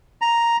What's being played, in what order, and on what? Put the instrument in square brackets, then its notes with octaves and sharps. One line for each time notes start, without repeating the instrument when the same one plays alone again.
[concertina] A#5